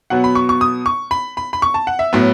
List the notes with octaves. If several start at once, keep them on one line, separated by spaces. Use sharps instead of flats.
B2 F#3 B3 F#5
B5
C#6
C#6
D#6
C#6
B5
B5
B5
C#6
A5
F#5
E5
A2 F#3 B3